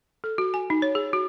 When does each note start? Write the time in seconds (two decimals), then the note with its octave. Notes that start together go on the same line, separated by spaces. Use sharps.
0.24 A4
0.38 F#4
0.54 G#5
0.70 D#4
0.82 C#5
0.95 G#4
1.13 F#4